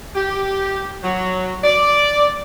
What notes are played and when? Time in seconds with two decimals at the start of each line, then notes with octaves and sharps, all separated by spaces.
0.15 G4
1.03 F#3
1.63 D5